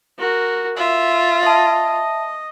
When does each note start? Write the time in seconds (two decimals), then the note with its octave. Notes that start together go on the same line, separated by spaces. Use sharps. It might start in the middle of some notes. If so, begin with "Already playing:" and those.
0.18 F#4 A#4
0.77 F4 E5
1.43 D#5 E5 A5